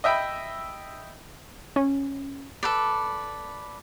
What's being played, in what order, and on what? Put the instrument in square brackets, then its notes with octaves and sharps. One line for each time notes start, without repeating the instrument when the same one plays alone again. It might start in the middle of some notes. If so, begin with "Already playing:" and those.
[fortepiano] D#5 E5 G5 B5
[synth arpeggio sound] C#4
[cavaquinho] A4 B4 D5